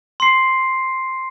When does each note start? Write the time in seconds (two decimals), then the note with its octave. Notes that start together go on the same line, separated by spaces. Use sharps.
0.20 C6 C7